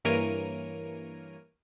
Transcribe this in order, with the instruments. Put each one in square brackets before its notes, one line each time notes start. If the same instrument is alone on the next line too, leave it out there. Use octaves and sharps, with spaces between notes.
[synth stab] G2 E3 A#3 A#4 C#5 D#7